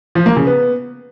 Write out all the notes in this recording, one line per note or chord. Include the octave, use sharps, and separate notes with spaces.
F3
A#3
C#3
B3